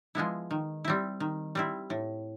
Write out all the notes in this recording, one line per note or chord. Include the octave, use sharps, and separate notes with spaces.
F3 G#3 B3 E4
D#3
G3 C4 E4
D#3
G3 C4 E4
A2